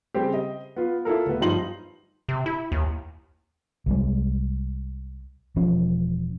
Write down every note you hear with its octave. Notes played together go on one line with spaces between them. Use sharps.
C#3 G3 C4 G4
D#5
B3 F4
E4 F4 A4 A#4
D1 B3
G2 F3 D#4 C6 F#7
C3
E4
D#2
C2 G3 G#3
E1 F3 C#4